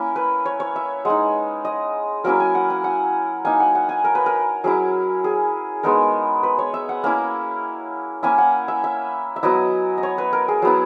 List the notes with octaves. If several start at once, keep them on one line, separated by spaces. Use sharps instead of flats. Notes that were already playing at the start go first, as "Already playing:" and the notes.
Already playing: A#3 C#4 E4
B4
C#5
C#5
E5
G#3 D#4 F#5
D#5
F#3 A#3 C#4 E4 A#4
G#5
F#5
G#5
F#5
A#3 D#4 G#5
F#5
F#5
G#5
A#4
B4
A#4
F#3 C#4 E4 G#4
G#4
G#3 B3 D#4 A#4
B4
C#5
E5
F#5
A#3 C#4 E4
A#3 C#4 E4 G#5
F#5
E5
E5
E5
F#3 B3 E4 D#5
D#5
C#5
B4
A#4
G#4
F#3 B3 E4 G#4